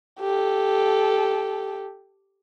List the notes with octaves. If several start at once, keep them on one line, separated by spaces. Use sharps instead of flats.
G4 A4